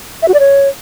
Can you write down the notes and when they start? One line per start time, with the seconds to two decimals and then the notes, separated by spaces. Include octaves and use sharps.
0.22 E5
0.28 F#4
0.34 D5
0.39 C#5